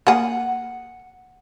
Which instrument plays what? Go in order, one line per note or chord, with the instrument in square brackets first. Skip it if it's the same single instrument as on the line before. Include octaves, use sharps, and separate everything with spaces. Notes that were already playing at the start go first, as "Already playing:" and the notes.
[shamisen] A#3 G#4 [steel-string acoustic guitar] F#5